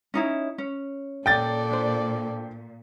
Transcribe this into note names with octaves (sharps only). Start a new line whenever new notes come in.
C#4 D#4 E4
C#4
A#2 A4 D5 G5 A6
D4 C5